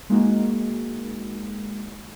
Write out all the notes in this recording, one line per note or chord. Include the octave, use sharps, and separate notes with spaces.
G#3 A#3 D#4 F#4